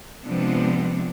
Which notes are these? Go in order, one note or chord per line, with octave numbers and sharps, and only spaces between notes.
C3 F3 G#3 B3 C4 D4